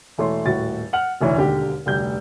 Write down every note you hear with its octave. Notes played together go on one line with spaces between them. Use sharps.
E1 E3 A3 C#5 C6
D#1 A2 F#4 A6
F#5 F6 F#7
F1 D2 E3 C#5
E1 D#2 D3 G4
F1 D2 G3 G6